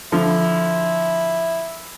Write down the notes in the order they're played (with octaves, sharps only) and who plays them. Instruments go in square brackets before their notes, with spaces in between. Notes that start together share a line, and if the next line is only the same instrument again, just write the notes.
[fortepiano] D3 F3 [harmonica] E4